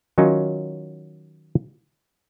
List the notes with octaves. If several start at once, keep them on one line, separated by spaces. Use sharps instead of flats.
D#3 F#3 C#4 D#4 F4 F#4